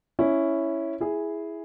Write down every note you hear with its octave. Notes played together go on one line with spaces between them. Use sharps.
C#4 E4
E4 G#4